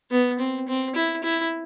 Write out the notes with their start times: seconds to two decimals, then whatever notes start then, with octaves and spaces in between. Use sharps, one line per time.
0.11 B3
0.39 C4
0.68 C4
0.95 E4
1.24 E4